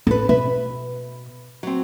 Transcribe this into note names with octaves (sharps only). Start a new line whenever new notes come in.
A1 A4 B4
B2 B4 E5
F#3 C4